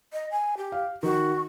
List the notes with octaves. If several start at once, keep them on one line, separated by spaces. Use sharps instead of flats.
D#5
G#5
G4
F5
D#3 F#4